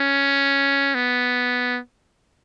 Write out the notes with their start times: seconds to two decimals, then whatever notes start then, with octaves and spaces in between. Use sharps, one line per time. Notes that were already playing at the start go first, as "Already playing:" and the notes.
Already playing: C#4
0.95 B3